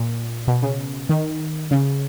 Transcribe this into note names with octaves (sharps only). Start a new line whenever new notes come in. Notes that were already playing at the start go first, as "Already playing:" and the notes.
Already playing: A#2
B2
C#3
D#3
C#3